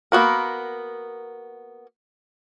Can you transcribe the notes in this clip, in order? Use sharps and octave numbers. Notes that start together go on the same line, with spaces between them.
A#3 B3 F#4 A#4